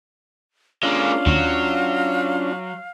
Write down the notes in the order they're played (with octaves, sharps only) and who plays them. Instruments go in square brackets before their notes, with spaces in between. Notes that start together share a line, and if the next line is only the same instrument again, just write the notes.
[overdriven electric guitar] G#3 A#3 [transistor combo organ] C#4 D4 F4 [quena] F5
[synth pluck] D#2 [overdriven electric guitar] F#3